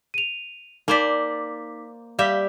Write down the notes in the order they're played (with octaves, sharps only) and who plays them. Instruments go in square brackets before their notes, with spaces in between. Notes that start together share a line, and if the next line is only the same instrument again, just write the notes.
[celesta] D#7 F7
[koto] A#3 C5 D5 [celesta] D#4 D6 B6
[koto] G3 G4 E5 [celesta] F5